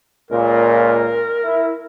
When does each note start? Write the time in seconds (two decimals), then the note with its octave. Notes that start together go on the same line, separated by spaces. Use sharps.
0.31 C#2 A#2 A#4
1.44 E4